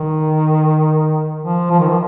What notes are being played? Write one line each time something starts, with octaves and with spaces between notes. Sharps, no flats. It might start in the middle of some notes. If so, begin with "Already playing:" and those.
Already playing: D#3
F3
F3
D#3
F3